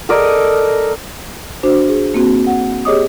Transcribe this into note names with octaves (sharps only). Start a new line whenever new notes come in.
A4 A#4 D5 D#5
D4 F#4 C5
G#4
A#3 C4 F#4
F#5
G4 G#4 C#5 D#5 D6 D#6